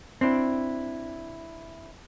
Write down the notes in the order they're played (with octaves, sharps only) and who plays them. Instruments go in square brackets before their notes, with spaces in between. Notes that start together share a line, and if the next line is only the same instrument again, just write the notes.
[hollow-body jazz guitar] C4 D4 E4